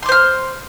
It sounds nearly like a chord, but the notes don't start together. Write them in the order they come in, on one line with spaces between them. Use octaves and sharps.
C6 D6 C5 F6